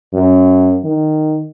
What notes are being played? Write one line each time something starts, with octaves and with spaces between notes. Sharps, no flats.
F#2
D#3